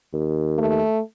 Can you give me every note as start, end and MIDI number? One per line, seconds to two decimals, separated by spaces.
0.13 0.81 39
0.58 1.00 57